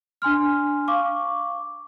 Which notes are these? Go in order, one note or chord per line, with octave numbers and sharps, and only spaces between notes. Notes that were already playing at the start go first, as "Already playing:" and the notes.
D4 G#5 C6 F6
F5 C#6 D6